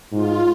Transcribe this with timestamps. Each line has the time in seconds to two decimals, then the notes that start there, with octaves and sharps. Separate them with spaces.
0.12 G#2 F4